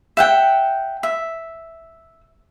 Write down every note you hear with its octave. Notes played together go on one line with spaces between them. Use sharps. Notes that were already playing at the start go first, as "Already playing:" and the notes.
E5 F#5 G5
E5